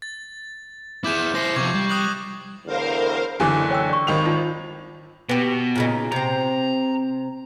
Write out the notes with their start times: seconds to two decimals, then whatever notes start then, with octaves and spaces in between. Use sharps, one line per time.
0.02 A6
1.04 E4 G#4 D6 G6 E7
1.35 E4 C5 A#6 C7
1.56 C3 F3 C#6 D6 G#6
1.74 G3
1.89 D#6 F#6 F#7
2.66 E2 A2 D3 A#4 C5 F5
3.40 F#1 D3 E3 G#5 D6
3.70 C#5 G5 E6
3.89 D5 C#6
4.07 G#1 D#3 F7
4.25 D#4 F4 D#5
5.29 B2 B3 G4
5.76 A#2 C#3 D#4
6.12 C3 C4 A#5